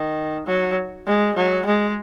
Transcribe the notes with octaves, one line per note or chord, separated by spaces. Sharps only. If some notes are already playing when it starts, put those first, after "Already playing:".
Already playing: D#3
F#3
G#3
F#3
G#3